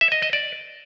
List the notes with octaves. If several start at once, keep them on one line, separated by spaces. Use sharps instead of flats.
E5
D#5
D#5
D5